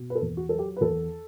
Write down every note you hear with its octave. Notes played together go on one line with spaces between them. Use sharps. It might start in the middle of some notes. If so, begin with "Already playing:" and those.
Already playing: B2
B4
A4
E2
F#4
F#3 A4
G4
B4
E2 A4